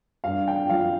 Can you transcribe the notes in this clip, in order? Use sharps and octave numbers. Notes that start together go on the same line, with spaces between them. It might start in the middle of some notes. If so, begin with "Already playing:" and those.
G2 F5
G5
F3 F5